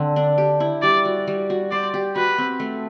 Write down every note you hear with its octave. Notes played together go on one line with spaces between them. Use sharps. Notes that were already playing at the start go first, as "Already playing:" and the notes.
Already playing: D3 C4
D4
G4
E4
G3 D5
F#4
G3
F#4
C5 D5
G4
F#4 B4
C4
A3